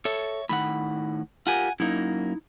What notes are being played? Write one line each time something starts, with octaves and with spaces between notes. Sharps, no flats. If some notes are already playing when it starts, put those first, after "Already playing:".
A4 C#5 E5
A2 D#3 F#5 B5
F4 G4 A#4 F#5 G#5
F#2 A#3 D#4 E4